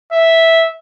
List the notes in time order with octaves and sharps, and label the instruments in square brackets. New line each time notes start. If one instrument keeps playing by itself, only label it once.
[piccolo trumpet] E5